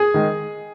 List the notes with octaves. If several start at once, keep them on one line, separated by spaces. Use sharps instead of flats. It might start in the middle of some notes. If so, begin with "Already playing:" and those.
Already playing: G#4 G#5
D#3 G#3